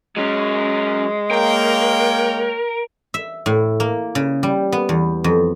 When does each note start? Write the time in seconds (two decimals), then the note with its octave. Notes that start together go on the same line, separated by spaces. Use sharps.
0.17 F#3 G#3 C#4
1.31 A#3 A#4 C#5 G5
3.14 E5
3.46 A2
3.80 A#3
4.15 C#3
4.43 G3
4.72 B3
4.89 E2
5.24 F2